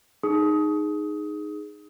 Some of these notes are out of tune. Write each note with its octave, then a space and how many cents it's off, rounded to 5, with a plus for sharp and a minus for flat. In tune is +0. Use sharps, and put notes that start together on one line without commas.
D#4 -10 G#4 +0 D#6 +20